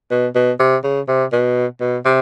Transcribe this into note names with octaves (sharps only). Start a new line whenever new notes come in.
B2
B2
C3
C#3
C3
B2
B2
C3